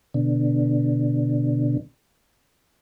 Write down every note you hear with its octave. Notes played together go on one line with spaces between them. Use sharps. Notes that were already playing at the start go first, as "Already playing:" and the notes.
B2 D3